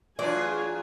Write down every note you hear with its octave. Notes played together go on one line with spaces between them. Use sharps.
E2 F#3 D4 F4 G#4 D5 G#5